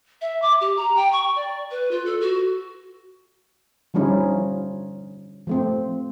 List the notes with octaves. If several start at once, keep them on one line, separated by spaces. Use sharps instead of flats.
E5
D6
G4
A#5
G5
C#6
D5
B4
F4
A4
F#4
D3 F3 G3 C#4 D#4 E4
F3 A3 C4